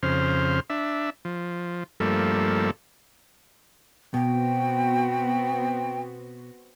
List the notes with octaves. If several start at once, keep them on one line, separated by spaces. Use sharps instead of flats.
F2 C#3 C5 F6
D4 E5
F3
G2 F3 G3 A3 A#3 A4
B2 B3 C4 F#4 G5